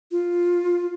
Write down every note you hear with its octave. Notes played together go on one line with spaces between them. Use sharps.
F4